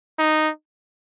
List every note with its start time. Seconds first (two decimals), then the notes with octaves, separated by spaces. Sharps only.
0.19 D#4